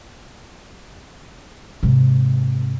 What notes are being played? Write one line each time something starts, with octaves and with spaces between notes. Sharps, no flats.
G#2 C3